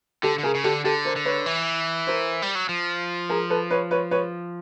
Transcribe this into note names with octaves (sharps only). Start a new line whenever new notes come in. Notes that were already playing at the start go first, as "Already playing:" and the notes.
D3 G4 A4
D3
C#3 G#4 A#4
C#3
D3 G4 A4
D3 G4 A4
A#4 C5
D3
B4 C#5
E3
A#4 C5
G3
F#3
F3
G#4 A#4
A4 B4
B4 C#5
B4 C#5
B4 C#5